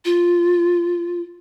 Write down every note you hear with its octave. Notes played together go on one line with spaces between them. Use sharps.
F4